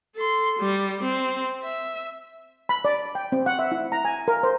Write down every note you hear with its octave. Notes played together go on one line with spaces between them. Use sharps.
A4 C6
G3
C4
E5
B5
D5
G5
C4
F#5
E5
E4
A#5
G#5
A#4
C5